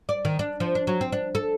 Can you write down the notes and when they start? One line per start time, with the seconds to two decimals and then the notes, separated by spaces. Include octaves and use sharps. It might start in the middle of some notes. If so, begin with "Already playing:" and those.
0.09 D5
0.25 D#3
0.39 D4
0.60 F3
0.75 D4
0.87 F#3
1.01 C4
1.12 D4
1.35 A4